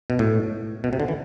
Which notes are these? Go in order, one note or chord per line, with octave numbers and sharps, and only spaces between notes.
B2
A2
B2
C3
D3
E3